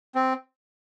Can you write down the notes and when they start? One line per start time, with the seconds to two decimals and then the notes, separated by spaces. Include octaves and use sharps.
0.15 C4